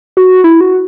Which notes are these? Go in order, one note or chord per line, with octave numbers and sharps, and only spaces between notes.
F#4
E4
F#4